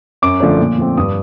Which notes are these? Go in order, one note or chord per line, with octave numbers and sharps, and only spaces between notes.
F#2 D6
D3 F3 A3 D4
A#2
F3 A3 C4
G2 D#6